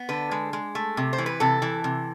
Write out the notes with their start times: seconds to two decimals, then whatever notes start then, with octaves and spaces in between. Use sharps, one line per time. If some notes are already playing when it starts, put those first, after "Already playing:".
Already playing: B3
0.09 D3 B4
0.31 G#3
0.53 G#3
0.75 A3
0.97 C3
1.13 C5
1.18 E3
1.26 B4
1.40 C3 A4
1.62 E3
1.84 C3